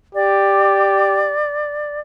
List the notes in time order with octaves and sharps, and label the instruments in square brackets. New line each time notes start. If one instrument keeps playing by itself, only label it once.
[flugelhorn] G4 [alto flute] D5